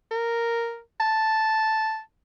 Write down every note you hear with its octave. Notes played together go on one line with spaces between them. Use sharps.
A#4
A5